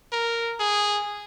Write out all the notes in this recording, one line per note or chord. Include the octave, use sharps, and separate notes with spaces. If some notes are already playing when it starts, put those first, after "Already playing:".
A#4
G#4